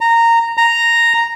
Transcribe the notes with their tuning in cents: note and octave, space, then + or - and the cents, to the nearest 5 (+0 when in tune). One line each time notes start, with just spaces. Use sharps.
A#5 -15
A#5 -5